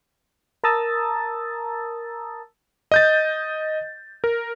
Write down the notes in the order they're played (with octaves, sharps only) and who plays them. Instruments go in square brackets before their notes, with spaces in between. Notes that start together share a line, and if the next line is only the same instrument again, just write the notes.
[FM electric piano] A#4 A5 A#5 D#6 E6 A6
[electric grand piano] D#5 G6 A6
A#4